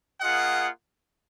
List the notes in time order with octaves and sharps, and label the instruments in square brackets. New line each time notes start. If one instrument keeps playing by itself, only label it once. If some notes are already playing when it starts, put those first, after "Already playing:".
[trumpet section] A#3 F4 G#4 D#5 F#5